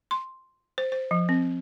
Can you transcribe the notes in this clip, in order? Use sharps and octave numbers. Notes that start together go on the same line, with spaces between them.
C6
C5
C5
F3
C4